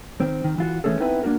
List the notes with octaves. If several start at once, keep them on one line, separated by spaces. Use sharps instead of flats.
D#3 C4
D#3
E3 F4 F#4
E3 G#3 A3 C#4 G#4 A4
B3 C4 D#4 E4 A4 B4
A#3 D4 F#4 A#4